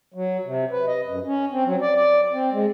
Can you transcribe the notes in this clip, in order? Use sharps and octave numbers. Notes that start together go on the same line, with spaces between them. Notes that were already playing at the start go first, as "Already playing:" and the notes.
F#3
C3
B4
D#5
F#2
C#4
C4
F#3
D5
D5
C4
G#3